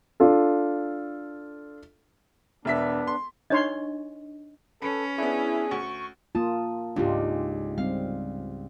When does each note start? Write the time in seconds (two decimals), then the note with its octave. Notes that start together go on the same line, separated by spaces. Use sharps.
0.20 D4 F4 A4
2.65 E1 B3 D4 E5 B6
3.07 C6
3.50 D4 D#4 C#5 D#5 C6
4.82 C#4 A4 B4
5.18 B3 D4 E4 G#4
5.71 D2 C#6
6.35 A#3 F4 A5 D#6
6.96 C#2 G#2 D4 F4 G4
7.78 G3 C4 F5